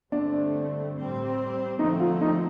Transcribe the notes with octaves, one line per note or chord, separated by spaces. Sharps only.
G2 D3 A3 C4 D4
A2 G3 C4
D3 F3 A3 C4 D#4
F4
D#4